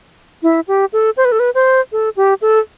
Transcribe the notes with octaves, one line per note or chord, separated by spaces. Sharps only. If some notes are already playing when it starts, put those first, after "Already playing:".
E4
G4
A4
C5
B4
A4
B4
C5
A4
G4
A4